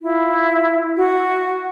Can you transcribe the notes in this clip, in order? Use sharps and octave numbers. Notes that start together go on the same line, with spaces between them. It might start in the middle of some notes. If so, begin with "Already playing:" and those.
E4 F4
F#4